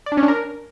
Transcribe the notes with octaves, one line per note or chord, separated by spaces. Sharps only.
D5
D4
C#4
D4
A#4